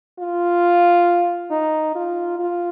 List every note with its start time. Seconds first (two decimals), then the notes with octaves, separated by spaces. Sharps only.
0.19 F4
1.51 D#4
1.95 F4
2.39 F4